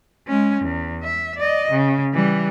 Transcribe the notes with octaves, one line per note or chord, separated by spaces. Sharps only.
G#3 C#4
E2
E5
D5 D#5
C#3
E3 G3